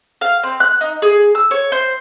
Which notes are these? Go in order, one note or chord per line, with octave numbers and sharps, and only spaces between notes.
F5
C4
F#6
D#4
G#4
E6
C#5
C5